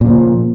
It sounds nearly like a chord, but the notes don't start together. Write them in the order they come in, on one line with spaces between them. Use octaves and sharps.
A#2 C#3 F3